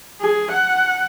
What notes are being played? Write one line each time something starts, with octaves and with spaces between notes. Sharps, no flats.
G#4
F#5